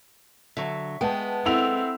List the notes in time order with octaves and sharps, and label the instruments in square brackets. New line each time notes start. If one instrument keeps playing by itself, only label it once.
[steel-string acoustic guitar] D3 F#3 [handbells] E5 C#6
[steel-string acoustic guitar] G#3 B3 [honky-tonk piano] G5 A5
[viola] C4 [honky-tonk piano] E4 E6 F7 [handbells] A4 E5 F#5